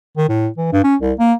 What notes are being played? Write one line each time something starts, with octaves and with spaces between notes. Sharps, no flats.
D#3
A2
E3
G2
C#4
C2
A#3